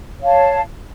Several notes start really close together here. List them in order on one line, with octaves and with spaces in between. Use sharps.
C#5 F5 A5